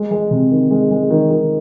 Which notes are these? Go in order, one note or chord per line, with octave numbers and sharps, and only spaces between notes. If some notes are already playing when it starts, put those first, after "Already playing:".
Already playing: G#3
G#3
C3
D#3
G#3
G#3
D#3
D#3